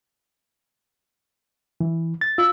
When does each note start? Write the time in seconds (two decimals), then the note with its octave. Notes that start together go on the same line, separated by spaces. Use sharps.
1.81 E3
2.21 A6
2.38 F4 E6